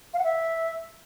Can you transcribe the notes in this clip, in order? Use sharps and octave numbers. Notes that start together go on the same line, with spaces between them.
F5
F#5
E5